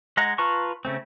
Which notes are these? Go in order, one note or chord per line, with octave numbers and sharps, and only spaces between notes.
G#3 D#5 F#5 A#5
F4 B4 A5 A#5 C#6
C#3 A3 C4